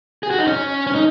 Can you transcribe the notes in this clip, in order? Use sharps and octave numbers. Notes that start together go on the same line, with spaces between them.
G#4
F#4
D#4
C#4
C#4
D#4